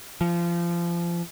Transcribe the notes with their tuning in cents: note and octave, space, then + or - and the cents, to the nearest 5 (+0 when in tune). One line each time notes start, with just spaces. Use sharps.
F3 -25